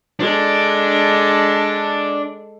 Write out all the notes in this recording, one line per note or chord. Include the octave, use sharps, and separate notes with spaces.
G#3 D4 A4